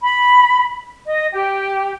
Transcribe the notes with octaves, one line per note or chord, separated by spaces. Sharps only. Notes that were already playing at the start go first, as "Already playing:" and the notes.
B5
D#5
G4